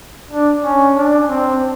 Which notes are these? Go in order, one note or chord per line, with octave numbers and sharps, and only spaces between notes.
D4
C#4
D4
C4